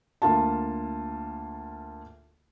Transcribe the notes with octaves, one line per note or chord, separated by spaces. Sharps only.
D2 A#3 F4 A5